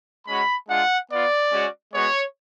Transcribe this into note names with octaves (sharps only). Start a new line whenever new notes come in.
G#3 C#4 F#4 B5
G#3 D4 F4 F#5
B3 F4 D5
G#3 C#4 F#4
G#3 B3 F#4 C#5